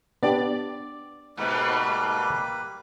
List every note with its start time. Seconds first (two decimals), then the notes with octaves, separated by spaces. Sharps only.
0.23 B3 D4 G4 D5
1.37 G#2 B2 G3 A#3 B4